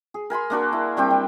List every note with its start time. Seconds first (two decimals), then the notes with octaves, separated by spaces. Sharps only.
0.14 G#4
0.30 A#4 G#5 B5 C6
0.50 A#3 D4 F#4 A#4
0.73 E4
0.97 G3 C4 G4 G5
1.11 G3